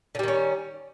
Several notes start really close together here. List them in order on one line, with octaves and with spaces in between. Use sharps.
D3 G3 D#3 C#4